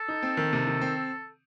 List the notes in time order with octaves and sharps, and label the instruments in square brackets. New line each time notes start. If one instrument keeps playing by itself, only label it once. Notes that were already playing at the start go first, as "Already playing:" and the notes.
Already playing: [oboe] A4
[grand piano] D#4
C4
D#3
C3
D#3
C4